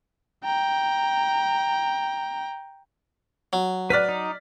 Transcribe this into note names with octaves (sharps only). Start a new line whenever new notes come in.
G5 A#5
F#3
B4 D5 F6 F#6 B6
D#4